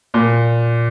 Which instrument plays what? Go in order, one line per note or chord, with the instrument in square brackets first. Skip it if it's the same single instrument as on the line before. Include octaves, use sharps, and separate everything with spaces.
[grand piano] A#2